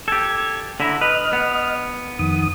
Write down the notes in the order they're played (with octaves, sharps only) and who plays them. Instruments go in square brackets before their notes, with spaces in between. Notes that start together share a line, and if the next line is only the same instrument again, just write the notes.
[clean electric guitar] G4 A4 [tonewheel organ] G#6
[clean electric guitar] D3 E4 [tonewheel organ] A#5 B5
[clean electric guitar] B4 [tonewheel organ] D#5 F6
[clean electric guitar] B3
[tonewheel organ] F2 D#3 D#6